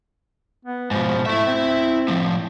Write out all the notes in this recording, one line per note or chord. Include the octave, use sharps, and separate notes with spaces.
B3
G#2 B2 F3
A3 E4 E5
C4
A2 F3